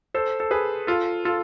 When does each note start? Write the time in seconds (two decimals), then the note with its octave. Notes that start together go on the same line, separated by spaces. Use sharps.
0.14 A4 C5
0.40 A4
0.51 G#4 B4
0.87 F4 A4
1.25 F4 A4